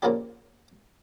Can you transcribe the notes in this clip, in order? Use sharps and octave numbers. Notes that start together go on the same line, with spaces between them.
A#2 C#3 F3 A#3 D4 G4